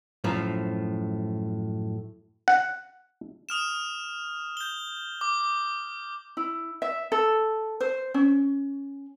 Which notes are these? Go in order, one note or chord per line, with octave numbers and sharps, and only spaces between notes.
F#2 A2 F3
F#5
D#6 F6 E7
G6 G7
D6
E4
E5
A4
C5
C#4